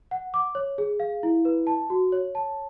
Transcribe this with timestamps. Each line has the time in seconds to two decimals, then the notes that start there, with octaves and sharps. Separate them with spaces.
0.11 F#5
0.34 D6
0.55 C#5
0.78 G#4
1.00 F5
1.23 E4
1.45 B4
1.67 A5
1.90 F#4
2.12 C#5
2.35 A5